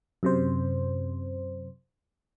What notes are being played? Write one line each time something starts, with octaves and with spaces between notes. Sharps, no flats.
F#2 C3 C5